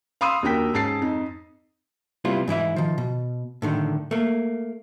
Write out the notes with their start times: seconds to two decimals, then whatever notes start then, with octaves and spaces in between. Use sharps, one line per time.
0.21 F5 B5 C6 D#6 E6 D#7
0.43 D#2 D4 F#4 A#4 G5 B6
0.73 G#2 C#4 A5 A6 C7
1.01 F2 D#4
2.25 C3 G3 B3 E4 F4
2.47 G#2 E3 E4 E5
2.76 D#3 F3
2.98 B2
3.62 A2 D3 D#3
4.11 A3 A#3